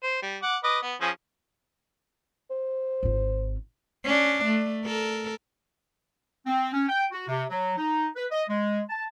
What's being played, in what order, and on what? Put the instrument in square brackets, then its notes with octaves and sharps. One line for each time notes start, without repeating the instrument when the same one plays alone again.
[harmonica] C5
G3
F#5 D6
B4 D#5 D6
B3
F3 C#4 G#4
[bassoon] C5
[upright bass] G#1 F4
[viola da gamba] C#4 D4
A3
A4 A#4
[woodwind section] C4
C#4
G5
F#4
C3
F#3
D#4
B4
D#5
G#3
A5